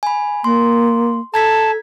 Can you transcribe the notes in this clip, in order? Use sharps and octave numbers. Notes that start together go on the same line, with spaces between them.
G#5 B5
A#3 C6
A4 A5 A#5 G#6 B6